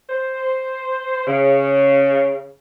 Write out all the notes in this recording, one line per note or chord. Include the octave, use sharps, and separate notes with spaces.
C5
C#3